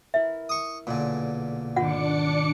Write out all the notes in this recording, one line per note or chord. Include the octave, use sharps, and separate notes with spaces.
E4 A#4 E5
C#6 D#6
B1 A#2 D3 G#4
G#1 D#3 D4 F4 F#5 D6 C#7